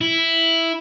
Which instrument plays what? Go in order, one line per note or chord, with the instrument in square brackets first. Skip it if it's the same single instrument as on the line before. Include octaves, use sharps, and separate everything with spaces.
[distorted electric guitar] E4